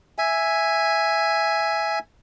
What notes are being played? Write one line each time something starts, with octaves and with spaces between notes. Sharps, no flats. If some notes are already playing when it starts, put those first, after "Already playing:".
E5 G#5